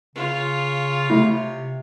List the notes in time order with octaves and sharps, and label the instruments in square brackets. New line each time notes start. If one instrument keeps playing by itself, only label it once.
[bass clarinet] C#3 [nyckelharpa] F4 C#5
[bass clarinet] C3 [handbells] A3 E4